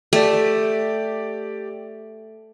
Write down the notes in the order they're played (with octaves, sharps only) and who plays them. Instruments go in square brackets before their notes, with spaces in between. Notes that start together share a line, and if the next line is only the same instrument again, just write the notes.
[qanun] A3 [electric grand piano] G4 D5